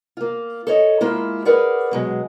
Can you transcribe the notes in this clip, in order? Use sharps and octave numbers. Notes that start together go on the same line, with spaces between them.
A#3 F4
A4 C#5 D#5
G#3 A#3 E4 F4
G#4 A#4 B4 D5 F#5
B2 F#3 G#3